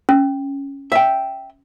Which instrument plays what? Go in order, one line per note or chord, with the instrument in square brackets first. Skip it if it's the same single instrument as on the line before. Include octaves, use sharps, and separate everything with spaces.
[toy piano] C#4
[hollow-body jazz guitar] E5 G5